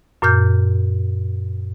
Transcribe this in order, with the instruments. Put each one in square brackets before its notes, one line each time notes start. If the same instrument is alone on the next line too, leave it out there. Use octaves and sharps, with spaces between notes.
[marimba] F#2 A#2 F6 G6